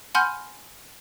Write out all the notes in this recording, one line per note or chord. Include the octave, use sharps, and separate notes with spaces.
F#5 G#5 B5 C6 F6 G6